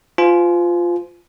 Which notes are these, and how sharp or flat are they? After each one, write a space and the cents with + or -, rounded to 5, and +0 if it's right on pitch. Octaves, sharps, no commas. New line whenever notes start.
F4 +0 C5 -40 G#5 +35